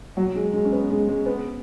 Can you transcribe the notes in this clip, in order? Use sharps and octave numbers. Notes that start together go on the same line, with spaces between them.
F#3
G#3
G#3
C#4
B3
G#3
G#3
B3